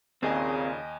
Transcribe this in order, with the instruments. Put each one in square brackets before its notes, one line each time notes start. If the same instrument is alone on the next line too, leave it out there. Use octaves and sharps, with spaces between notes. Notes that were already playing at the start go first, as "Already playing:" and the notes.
[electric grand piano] D#2 D#5 G#5 [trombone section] A#2 C#3 [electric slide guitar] C4 G#4